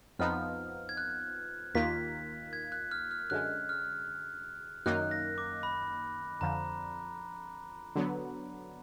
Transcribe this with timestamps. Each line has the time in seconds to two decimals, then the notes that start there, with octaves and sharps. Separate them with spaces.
0.19 F2 F3 B3 D#4 F6
0.89 G#6
0.97 F#6
1.74 D#2 D#3 A#3 F4 B6
2.53 G#6
2.72 F#6
2.91 F6
3.11 F6
3.30 F#2 D3 G#3 F#6
3.69 F6
4.86 F#2 D#3 A#3 D#4 F#6
5.11 A#6
5.38 D6
5.63 B5
6.41 F2 D3 F3 A#5
7.95 D3 F#3 B3